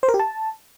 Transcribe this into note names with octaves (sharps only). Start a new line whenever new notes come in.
C5
A#4
G4
A5